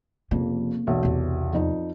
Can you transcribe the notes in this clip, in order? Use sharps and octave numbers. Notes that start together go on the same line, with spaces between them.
F1 F2 C#3 A#3
E1 B1 E5
E2 C3
F2 D#4 D5